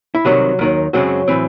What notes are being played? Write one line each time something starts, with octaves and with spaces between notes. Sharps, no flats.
E4
C2 C3 D#3 F#3 F#4
D#2 D#3 F#3
F#2 C#3 F#3 G#3 C4 F#4
A2 E3 C4